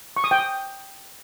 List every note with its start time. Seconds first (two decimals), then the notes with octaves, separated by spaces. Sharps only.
0.16 C#6
0.24 D#6
0.31 G5
0.39 D#6